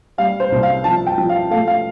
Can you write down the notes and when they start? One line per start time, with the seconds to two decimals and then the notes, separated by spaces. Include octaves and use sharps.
0.18 G3 F5
0.40 C5
0.52 C2
0.63 F5
0.84 F3 A5
1.07 G5
1.18 F3
1.29 F5
1.51 A3 F5
1.68 F5